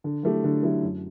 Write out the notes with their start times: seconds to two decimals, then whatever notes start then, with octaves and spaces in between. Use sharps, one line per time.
0.04 D3
0.23 F#3 A3 E4 G4
0.44 D3
0.63 F#3 A3 E4 G4
0.83 F#2